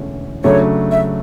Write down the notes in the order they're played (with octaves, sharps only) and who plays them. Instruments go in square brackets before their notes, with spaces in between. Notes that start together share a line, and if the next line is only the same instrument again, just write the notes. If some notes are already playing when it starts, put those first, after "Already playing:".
Already playing: [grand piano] E1 E2 D3 A3 C#4
[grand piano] C#3 F#3 A3 D4 [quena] C#5
[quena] E5